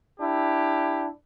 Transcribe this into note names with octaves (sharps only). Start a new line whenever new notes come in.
D4 E4 G4